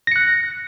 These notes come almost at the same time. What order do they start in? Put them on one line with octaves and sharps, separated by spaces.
A#6 C#7 F#6